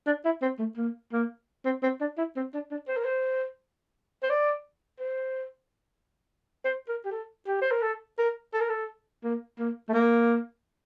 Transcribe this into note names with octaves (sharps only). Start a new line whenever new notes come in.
D4
E4
C4
A3
A#3
A#3
C4
C4
D4
E4
C4
D4
D4
C5
A#4
C5
C5
D5
C5
C5
A#4
G4
A4
G4
C5
A#4
A4
A#4
A4
A#4
A4
A#3
A#3
A3
A#3